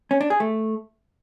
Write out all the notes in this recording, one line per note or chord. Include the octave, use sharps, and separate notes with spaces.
C#4
D4
G#4
A3